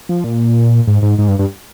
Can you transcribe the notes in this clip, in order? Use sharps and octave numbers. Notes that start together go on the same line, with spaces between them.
F3
A#2
G#2
G#2
G#2
G2
G2